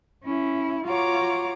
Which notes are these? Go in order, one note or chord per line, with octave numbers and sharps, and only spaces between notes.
C#4 E4
F4 F#4 C#5 A#5 D6